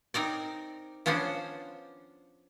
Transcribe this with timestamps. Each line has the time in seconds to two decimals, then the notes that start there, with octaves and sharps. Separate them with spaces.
0.14 C4 D#4 A#4 D5
1.06 F3 B3 C#4 D4 C5